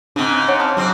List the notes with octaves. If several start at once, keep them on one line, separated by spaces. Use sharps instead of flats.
G#2 C#3 C4 D4
C5 C#5 F#5 C6
A5 D6 F6
G#2 F#3 C4